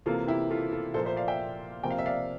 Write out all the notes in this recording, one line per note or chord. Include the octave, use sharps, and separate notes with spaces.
C3 E3 A#3 F4 A4
E4 G4
F4 A4
F4 A4
A#2 F3 A#3 A4 C5
C5 E5
D5 F5
E5 G5
C3 F3 A#3 G5
F5
E5
D5 F5